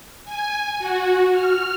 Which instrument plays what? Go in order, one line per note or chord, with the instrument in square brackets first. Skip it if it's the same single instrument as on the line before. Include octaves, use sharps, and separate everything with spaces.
[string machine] G#5
F#4
F6